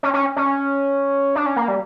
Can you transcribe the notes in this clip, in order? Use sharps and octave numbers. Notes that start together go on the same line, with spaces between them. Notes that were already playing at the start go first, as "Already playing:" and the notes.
C#4
C#4
C#4
D4
C#4
A#3
G3